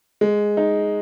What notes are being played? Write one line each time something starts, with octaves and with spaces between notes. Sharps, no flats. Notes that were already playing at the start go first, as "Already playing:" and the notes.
G#3
D#4